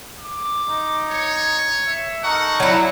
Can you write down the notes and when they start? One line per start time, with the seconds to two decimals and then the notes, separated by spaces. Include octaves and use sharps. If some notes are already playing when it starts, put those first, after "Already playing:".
0.19 D6
0.66 D#4
1.10 C#5
1.87 E5
2.24 D#4 A4 A#4 F#5 C#6
2.60 F#3 E4